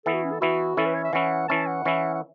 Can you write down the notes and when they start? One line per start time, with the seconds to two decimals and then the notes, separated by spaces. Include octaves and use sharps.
0.05 E3 B3 E4 A4
0.14 F#4
0.24 C#4
0.33 A4
0.41 E3 B3 E4 F#4
0.77 E3 C#4 E4 A4
0.86 B4
0.95 C#5
1.04 E5
1.13 E3 C#4 E4 F#5
1.48 E3 C#4 E4 A5
1.67 F#5
1.85 E3 C#4 E4
2.15 F#5